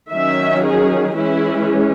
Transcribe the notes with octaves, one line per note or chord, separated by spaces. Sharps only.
D#3 F#3 C#4 E5
G#4
E3 G#3 C#4 E4